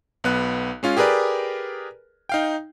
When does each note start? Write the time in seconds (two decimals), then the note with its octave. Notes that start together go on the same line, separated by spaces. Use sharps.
0.24 B1 B3 F#6
0.83 G#3 C#4 F4
0.97 G4 G#4 A#4 B4 D5
2.29 D#4 F5 G5